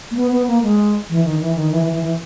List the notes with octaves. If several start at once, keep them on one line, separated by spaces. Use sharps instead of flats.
A#3
B3
B3
A#3
G#3
E3
D#3
E3
D#3
E3
E3
E3
E3